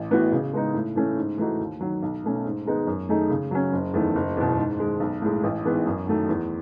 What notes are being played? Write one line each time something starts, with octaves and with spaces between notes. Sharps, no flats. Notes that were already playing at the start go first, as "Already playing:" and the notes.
Already playing: A1
A2 E3 B3 F#4
C#3
G#3 B3 D#4
A2
E3 A3 C#4
G#2
E3 A3 D#4 F#4
D#2
D#3 F#3
B1
B2 A3 C#4
G#2
D#3 G#3 B3 D#4
F#2
D#3 A3 D#4 G#4
C#3
F#3 C#4
F#1
E2 D#3 A3
F#1
E2 B2
G#2
D#3 G#3
B1
A2 G#3
A1
G#2 E3 G#3 B3
F#2
D#3 F#3 A3
E2